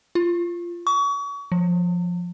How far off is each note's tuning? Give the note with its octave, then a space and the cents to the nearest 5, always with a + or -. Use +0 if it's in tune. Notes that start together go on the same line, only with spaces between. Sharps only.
F4 -15
C#6 +35
F3 +10